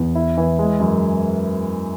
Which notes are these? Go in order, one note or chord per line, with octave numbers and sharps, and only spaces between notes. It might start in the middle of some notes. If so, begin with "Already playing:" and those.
Already playing: E2
E4
E3
G#3
F#2